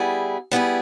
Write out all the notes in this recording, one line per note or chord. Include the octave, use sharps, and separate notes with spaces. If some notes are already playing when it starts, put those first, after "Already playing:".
Already playing: G3 B3 E4 G#4
G3 B3 E4 G#4